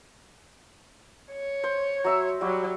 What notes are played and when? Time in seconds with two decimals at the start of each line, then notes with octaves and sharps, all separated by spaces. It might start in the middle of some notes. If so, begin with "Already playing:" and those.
1.32 C#5
1.64 C5
2.04 F#3 E5 E6
2.41 F#3 G3 F#4